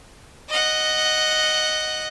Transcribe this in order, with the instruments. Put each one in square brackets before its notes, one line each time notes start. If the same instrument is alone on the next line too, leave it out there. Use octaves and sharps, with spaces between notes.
[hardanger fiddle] D#5 F#5